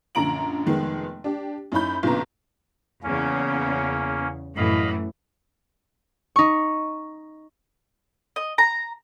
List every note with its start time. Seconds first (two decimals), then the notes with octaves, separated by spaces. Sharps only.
0.15 A#1 F#2 D3 A#5 D7 F#7
0.66 F1 D#3 G#3 B3
1.24 D4 G4
1.72 F#2 C#4 D#4 E4 B5 G6
2.03 B1 F#2 A#2 D3 B3 A#5
3.03 E2 C#3 A#3 C#4
4.56 F#2 A2 E3 D#5 F5 B5
6.36 D#4 C#6
8.36 D#5
8.58 A#5